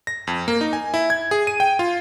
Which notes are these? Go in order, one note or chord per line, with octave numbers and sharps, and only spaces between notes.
A#6
F2
A#3
D#4
G#5
E4
G#6
G#4
D#7
G5
F4